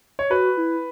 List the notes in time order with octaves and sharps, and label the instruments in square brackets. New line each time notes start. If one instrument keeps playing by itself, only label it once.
[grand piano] C#5
[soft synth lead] F#4 [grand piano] B4
[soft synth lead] E4